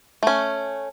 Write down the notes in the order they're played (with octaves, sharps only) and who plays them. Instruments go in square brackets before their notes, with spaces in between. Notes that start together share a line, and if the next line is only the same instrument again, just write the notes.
[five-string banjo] A3 C#4